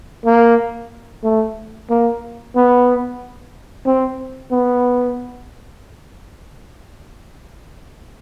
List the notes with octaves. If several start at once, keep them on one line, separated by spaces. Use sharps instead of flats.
A#3
A3
A#3
B3
C4
B3